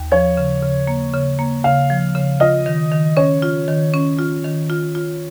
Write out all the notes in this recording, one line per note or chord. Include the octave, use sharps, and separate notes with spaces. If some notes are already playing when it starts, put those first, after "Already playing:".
Already playing: D#2
F3 C#5
C#3
C#3
A#3
C#3
A#3
C#3 F5
F3
C#3
F4 D#5
D#3
D#3
C#4 C#5
F4
D#3
C#4
F4
D#3
F4
F4